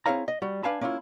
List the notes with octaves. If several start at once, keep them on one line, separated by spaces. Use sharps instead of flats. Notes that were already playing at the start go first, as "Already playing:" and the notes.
C4 E4 G#4 C#5 F5 A#5
D#5
G3 F#4
D4 B4 F5 G#5 A5 B5
A#3 C#4 D4 E4 F4